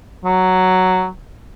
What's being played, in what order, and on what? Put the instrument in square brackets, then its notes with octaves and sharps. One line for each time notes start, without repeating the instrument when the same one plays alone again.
[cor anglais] F#3